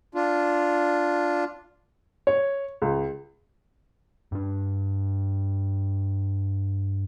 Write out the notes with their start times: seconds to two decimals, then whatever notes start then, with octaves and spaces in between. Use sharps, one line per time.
0.15 D4 F4
2.27 C#5
2.82 C#2
4.32 G2 D4